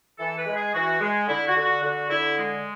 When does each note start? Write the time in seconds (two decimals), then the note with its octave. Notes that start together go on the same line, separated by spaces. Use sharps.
0.18 E3 A4
0.37 B4
0.46 G#3
0.55 G#4
0.74 E3 F#4
1.01 G#3
1.28 D3 E4
1.47 F#4
1.55 D3
1.64 F#4
1.82 D3 F#4
2.10 D3 E4
2.37 G#3